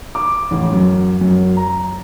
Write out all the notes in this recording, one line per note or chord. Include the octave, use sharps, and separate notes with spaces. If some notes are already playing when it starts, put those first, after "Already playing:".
D6
A1
F#2
F#2
A#5